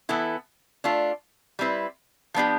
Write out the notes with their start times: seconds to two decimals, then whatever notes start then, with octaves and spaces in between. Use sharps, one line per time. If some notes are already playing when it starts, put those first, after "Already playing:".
0.09 E3 B3 E4 A4
0.84 A3 D4 F4
1.59 G3 C4 E4 B4
2.34 F3 B3 D4 G4